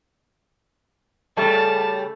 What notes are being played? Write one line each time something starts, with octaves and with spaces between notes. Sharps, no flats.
C#3 G3 A3 A5